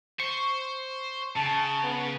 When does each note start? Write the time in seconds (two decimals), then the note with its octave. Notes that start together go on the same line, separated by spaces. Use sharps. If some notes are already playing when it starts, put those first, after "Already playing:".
0.20 C5 C#6
1.36 C#3 A5
1.83 B3